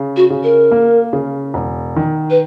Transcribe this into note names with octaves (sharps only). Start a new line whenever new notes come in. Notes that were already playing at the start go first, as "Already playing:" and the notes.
Already playing: C#3
F#4
C#3
A#4
A#3
C#3
E1
D#3
B4